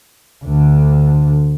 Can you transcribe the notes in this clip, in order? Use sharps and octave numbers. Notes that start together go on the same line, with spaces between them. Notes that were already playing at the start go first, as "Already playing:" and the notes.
D2 D3